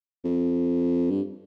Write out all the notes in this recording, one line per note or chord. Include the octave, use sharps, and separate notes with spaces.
F2
G2